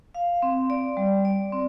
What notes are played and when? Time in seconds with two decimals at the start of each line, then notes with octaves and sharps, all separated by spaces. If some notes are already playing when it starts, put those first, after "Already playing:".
0.15 F5
0.42 C4
0.70 D5
0.97 G3
1.25 D5
1.53 C4